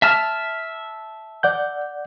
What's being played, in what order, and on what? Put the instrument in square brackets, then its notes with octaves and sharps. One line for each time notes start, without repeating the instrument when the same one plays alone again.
[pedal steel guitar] E5 A5 F6
[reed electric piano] D5 F#5 G6